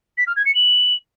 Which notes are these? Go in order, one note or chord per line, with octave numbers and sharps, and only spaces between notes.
B6
F6
G#6
C#7
F#7